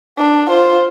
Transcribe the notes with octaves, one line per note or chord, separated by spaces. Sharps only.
D4
F4 C5